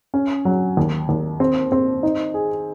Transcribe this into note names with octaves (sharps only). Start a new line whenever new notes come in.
C#4
F#3
D#2
D#2
C4
C4
D#4
G#4